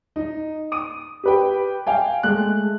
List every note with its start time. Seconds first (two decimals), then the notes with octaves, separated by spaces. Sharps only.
0.16 D#4
0.72 D#6 D#7
1.24 G4 B4 G5
1.87 F5 G5 G#5
2.23 G#3 A3 F#6